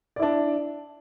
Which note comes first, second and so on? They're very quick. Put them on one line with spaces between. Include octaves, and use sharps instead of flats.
D5 E4 D4